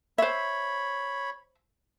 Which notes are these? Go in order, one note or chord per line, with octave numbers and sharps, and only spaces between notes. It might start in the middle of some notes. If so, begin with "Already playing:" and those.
C5 C#5 E5 B5